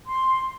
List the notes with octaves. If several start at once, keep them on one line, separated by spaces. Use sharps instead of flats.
C6